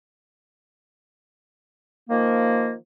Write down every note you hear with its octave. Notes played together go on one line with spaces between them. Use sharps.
D#3 F3 A#3